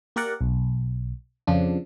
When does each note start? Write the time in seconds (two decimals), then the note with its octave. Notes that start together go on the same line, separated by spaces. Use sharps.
0.16 A#3 G4 A#4 D5 F#5
0.41 B1
1.47 F2 C#3 F3 D4